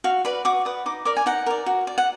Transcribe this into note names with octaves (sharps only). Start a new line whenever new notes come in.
F#4 F5
B4 D5 B5
F#4 D6
B4 D5 D#6
D#4 D6
A#4 D5 D6
G#5
D#4 F#5
A#4 D5
F#4
D5
F#5